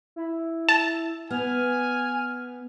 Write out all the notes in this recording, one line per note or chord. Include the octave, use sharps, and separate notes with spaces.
E4
A5
B3 G#5 F6